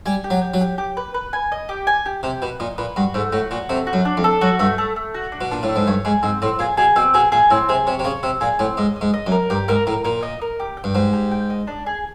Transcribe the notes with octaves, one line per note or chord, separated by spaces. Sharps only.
G3 G#5
G4
F#3
G4
F#3
G4
G4
B4
B4
G#5
D#5
G4
G#5
G4
C3 G4
B2 B4
A#2 D#5
A#2 B4
G2 F#4
G#2 A3
A2 F#4
A#2 F#4
C3 A3
F#4
F#2
D4
F2
A4
F#2 F#4
G2 A3
A3
A3
F#4
D4
B2
A#2 D4
A2
A3
G#2
G2 C#5
G#2 G#4
G#2 C4
A2 C4
A#2 G#4
B2 G#4
B2 C4
B2 G#4
A#2 G#4
A2 C4
C3 G#4
C3 C#5
C3
C#3 C#5
C3 C4
A#2 G#4
A2 C4
G#2 D#5
D#5
G#2
D#5
F#2
A#4
G2 G4
G#2 A#4
A2 A#4
A#2 A#4
D#5
A#4
G4
G5
G2
G#2 G4
G4
G5
D#5
D4
G#4